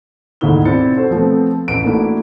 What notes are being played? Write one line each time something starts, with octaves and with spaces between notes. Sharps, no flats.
D2 G#2 D#3 A#3 E4 G7
B1 C4 E4 D5 A6 C#7
F#4 A4 C5
F3 A3 B3 C4
A1 E3 D7
A3 A#3 D4 E4 F#4